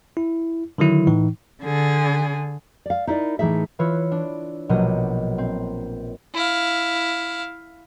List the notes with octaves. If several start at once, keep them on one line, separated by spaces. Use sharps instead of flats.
E4
D3 D#3 F#3 E4
A2 E3 D#4
D3 G#4
D5 F5
D#4 E4 A4 A#4 D5
A2 E3 D#4 G#4 E5
E3 F4 B4 C#5 E6
D4
A#1 B2 F#3 G4 C#5 D#5
C4
E4 F5